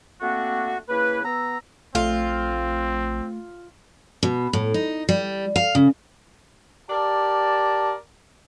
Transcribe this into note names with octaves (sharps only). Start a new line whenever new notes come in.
A3 A#3 C4 D4 F#4
C#3 A#3 E4 B4
B3 A#5 E6
A#1 A3 C4 F4
B2
A2
D#4
G3
F5
C#3
G4 A#4 D5 A5